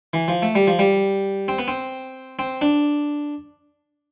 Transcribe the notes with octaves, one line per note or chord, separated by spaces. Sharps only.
E3
F3
A3
G3
F3
G3
C4
B3
C4
C4
D4